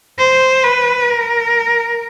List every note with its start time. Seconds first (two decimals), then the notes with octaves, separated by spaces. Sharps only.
0.19 C5
0.64 B4
1.10 A#4